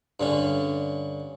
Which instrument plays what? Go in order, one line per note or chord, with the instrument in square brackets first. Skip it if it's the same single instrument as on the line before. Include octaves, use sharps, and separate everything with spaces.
[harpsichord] G2 D3 C#4